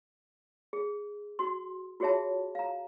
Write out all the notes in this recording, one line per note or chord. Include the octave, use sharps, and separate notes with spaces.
G#4
F#4 C6
F4 F#4 G#4 C#5 E5 A5
F5 A#5